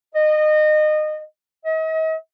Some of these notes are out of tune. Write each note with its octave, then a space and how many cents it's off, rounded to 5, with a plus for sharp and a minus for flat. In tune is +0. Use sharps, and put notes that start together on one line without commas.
D#5 -25
D#5 +40